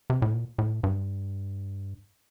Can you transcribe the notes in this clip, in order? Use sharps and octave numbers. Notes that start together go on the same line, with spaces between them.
C3
A2
A#2
A2
G2